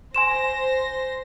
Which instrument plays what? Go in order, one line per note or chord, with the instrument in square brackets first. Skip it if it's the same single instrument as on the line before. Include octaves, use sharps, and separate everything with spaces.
[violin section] C5 A#6 [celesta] G#5 C6 E7